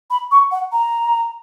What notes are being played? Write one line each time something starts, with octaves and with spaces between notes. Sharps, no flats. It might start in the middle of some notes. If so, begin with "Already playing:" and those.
B5
C#6
F#5
A#5